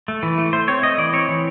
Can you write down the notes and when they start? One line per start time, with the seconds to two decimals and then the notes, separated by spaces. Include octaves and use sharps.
0.08 A3
0.23 E3
0.38 A3
0.53 A3 C5
0.68 C4 C#5
0.83 A3 D#5
0.98 E3 D5
1.13 C4 C#5
1.29 E3